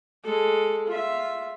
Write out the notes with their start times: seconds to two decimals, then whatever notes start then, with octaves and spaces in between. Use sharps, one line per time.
0.24 G#3 A4
0.87 F4 E5